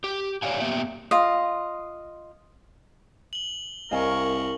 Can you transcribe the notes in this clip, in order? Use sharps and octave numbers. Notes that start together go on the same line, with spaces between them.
G4
G4 C#5 D5 F5 G5 G#5
A#3 B3 G4 E5 G5
F4 D#5
F#7 G7
C2 A#4 D#5 F5 G#5 C#6